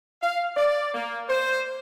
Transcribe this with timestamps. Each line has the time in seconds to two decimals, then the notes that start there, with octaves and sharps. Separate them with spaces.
0.22 F5
0.56 D5
0.94 A#3
1.29 C5